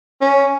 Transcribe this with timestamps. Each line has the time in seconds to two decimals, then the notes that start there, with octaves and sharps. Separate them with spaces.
0.21 C#4